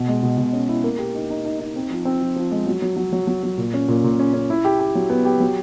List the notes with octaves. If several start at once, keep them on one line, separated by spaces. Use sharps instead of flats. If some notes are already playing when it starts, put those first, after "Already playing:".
Already playing: B2
G#3
B2
B2
C#4
E4
A#3
G4
D#4
D#4
D#4
D#4
C4
F3
C4
F3
F3
G#3
F#3
F#3
F#3
F#3
F#3
F#3
A#2
C#4
A#2
A#2
C#4
C#4
E4
G4
G4
F#3
B3
G4
F#3